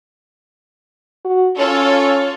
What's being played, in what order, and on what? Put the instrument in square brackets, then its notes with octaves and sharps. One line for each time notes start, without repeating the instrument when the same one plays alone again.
[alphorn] F#4
[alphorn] C#4 [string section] F4 A4 C#5